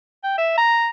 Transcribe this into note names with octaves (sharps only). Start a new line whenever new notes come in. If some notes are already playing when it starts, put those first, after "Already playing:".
G5
E5
A#5